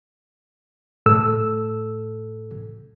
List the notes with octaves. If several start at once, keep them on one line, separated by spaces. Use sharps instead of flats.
A2 A4 E6